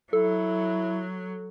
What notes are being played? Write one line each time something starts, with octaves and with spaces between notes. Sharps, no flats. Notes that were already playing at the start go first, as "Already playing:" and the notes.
F#3 E4 A4